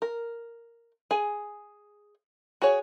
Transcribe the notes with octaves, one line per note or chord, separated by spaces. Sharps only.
A#4
G#4 G#5
F#4 G#4 C#5